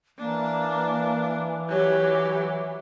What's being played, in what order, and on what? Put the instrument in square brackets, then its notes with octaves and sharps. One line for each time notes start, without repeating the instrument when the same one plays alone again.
[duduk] E3 [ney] A#3 [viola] D4
[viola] F#3 E4 [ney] G4 [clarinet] C#5